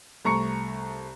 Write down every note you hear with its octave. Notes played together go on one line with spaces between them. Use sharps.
C2 A3 A#5 C#6 C#7